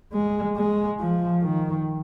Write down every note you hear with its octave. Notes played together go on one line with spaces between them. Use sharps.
G#3
G#3
F3
D#3